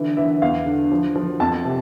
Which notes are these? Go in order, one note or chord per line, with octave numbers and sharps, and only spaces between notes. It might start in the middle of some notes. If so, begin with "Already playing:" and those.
Already playing: D3 E3
E3 E5
E2 F5
D3
F3
F3
F2 A5
C3